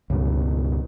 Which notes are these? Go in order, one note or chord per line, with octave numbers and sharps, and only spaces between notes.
C#2 G2 B2